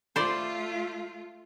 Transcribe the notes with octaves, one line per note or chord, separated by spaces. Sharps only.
A3 F4 C5 D5